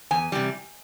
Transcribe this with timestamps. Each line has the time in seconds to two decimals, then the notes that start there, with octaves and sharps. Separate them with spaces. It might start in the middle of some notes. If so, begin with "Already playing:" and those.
0.11 E2 G#5
0.32 C3 E3 G3